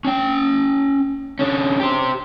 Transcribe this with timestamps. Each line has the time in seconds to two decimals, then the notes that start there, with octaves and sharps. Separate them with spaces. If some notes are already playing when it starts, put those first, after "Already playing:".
0.05 C#4 G5
1.39 D3 C#4
1.80 G4 C5